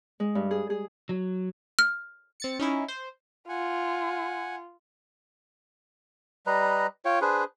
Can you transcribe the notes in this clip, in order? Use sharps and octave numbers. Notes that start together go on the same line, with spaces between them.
G#3
G2
G#4
G#4
F#3
F6
C4 A6 C#7
C#4 D#4 E4
C5
F4 F#5 G#5
G3 B4 D#5 A#5
F4 C#5 G5
D4 G#4 B4 C5